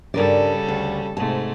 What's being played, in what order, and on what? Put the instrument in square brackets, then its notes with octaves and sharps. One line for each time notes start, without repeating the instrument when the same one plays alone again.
[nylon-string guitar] G2 A#4 D5 [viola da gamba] C#3 G3 A4
[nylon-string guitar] D2
[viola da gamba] G#2 C3 A3 [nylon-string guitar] A5